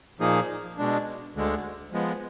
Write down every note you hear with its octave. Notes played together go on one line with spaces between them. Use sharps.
A#2 F3 A#3 D#4 G#4
B2 G#3 D4
D2 D3 G#3
F3 G#3 B3